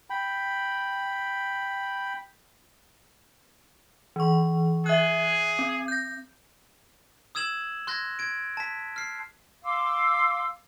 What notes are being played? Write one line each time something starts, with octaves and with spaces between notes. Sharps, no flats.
G5 B5
E3 C#6
G#4 E5 F#6
C4
G6 A#6
D#6 E6 G#6 E7 F#7
C6 F#6 G#6 A#6
G#6 D7
A5 B6
F6 C7
F5 C6 D6 E6